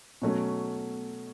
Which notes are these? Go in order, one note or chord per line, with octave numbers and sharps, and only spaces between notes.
B2 F#3 A3 C#4